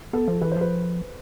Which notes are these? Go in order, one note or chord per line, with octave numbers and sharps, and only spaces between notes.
B3 A4
F3
E3 B4
C5
F3 B4